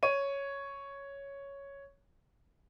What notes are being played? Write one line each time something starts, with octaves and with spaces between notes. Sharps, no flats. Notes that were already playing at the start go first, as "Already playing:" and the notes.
C#5 D#7